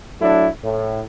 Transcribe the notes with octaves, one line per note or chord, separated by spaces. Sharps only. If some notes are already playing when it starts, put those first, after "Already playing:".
F#3 A3 D4 E4
A2